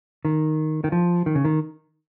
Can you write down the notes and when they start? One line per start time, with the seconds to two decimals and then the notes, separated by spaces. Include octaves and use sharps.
0.25 D#3
0.84 D#3
0.92 F3
1.26 D#3
1.35 C#3
1.45 D#3